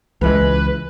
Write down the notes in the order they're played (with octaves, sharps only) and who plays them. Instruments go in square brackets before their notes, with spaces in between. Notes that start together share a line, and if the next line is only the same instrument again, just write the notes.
[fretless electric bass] C#2 E3 G#3 [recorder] B4